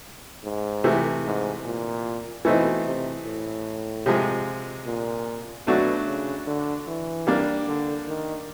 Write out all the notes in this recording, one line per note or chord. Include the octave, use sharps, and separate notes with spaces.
G#2
C3 E3 A3
G#2
A#2
B2 E3 A3 C4 D#4
C3
A2
C3 F3 G#3
A#2
B2 F#3 A3 D4 F#4
C#3
D3
E3
G3 A#3 D4
D3
D#3